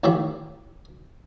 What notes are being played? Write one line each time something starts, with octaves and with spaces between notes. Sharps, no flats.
A1 A2 D#3 E4 G4 E5